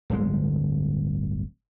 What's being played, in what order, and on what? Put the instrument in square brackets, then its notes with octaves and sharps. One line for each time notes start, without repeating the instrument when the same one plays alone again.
[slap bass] D1 G1 G#3